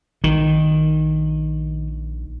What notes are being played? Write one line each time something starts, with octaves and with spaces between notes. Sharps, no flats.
A#1 D#3